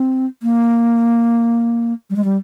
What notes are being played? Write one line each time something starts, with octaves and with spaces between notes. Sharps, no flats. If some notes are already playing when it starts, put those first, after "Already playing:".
Already playing: C4
A#3
G3
G#3
G3